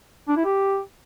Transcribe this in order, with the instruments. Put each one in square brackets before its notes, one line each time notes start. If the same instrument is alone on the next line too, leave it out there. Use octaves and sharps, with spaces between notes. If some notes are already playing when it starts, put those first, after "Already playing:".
[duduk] D4
E4
G4